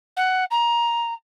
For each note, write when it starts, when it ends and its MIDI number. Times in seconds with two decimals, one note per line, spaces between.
0.16 0.44 78
0.51 1.14 82